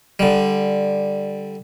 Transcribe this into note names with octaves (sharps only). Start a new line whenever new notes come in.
D3 G3